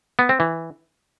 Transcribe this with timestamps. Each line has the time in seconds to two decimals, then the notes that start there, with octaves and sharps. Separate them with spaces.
0.19 B3
0.29 C4
0.40 E3